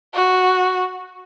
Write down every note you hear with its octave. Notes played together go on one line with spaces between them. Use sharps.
F#4